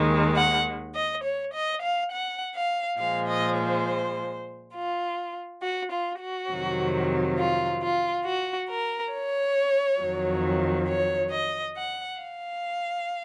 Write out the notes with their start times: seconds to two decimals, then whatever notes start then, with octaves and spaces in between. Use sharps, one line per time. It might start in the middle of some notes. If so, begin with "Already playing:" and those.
Already playing: D#2 D#3 G#3
0.36 F#5
0.94 D#5
1.24 C#5
1.53 D#5
1.82 F5
2.11 F#5
2.55 F5
2.98 A#2 F3 G#3 F5
3.28 D#5
3.57 C5
4.74 F4
5.62 F#4
5.91 F4
6.20 F#4
6.50 F2 C3 D#3 F#3
7.37 F4
7.81 F4
8.25 F#4
8.69 A#4
9.13 C#5
10.00 F2 D#3 F#3
10.88 C#5
11.31 D#5
11.76 F#5
12.20 F5